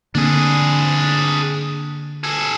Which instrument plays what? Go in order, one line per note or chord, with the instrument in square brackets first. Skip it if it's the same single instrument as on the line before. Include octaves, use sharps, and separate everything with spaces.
[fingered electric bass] D3 A#3 C4 [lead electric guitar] D4 G#4
[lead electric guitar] G#4 A4